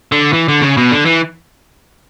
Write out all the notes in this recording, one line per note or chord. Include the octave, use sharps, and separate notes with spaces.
D3
E3
D3
C#3
B2
D3
E3